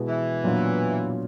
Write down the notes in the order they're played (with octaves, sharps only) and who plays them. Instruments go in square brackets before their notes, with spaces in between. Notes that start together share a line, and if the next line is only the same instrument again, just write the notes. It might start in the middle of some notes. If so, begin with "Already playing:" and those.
Already playing: [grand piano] B2 G#3 B3 E4
[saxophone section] E3
[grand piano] A#2 F#3 B3 D4 F4